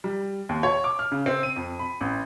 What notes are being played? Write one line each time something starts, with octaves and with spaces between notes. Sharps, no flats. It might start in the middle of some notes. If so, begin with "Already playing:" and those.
G3
D#2
C#5
D6
F6
C#3
C4
D#7
F2
B5
A1